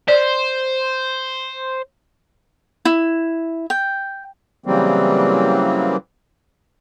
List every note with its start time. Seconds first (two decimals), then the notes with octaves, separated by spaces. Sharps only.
0.08 C5 D5
2.85 E4
3.70 G5
4.66 C#3 E3 F#3 G3 A#3 C4